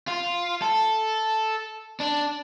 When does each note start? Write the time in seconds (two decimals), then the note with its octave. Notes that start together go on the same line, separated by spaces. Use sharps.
0.08 F4
0.62 A4
2.01 D4